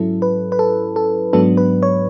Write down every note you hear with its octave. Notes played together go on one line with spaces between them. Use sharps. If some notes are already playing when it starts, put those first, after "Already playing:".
Already playing: G#2 F#3 C#4 E4 A4
B4
B4
A4
A4
G#2 F#3 B3 D4 A4
B4
C#5